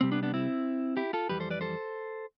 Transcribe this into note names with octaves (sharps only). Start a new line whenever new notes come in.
C2 C3 G3 C4
B3 D4
B3 D4
C4 E4
E4 G4
F4 A4
F2 E3 G3 G4 B4
A4 C5
B4 D5
A4 C5